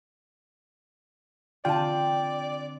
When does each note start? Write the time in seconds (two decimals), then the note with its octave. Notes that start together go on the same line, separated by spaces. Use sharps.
1.65 D3 C4 F4 D5 G5 A5